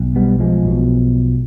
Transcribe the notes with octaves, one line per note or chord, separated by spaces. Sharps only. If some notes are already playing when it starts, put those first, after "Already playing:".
Already playing: B1
G3 B3
F3 G#3
B1 B2